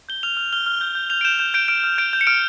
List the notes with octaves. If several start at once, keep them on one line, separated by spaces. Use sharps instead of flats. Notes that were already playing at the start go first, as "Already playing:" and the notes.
G6 G7
F6 F7
F6
F6 G7
F6
G6
G6
G6 F7
D7
G6 E7
G6 E7
G6 D7
F6 D7
F6
G6 D7
G6
C#7
F6 D7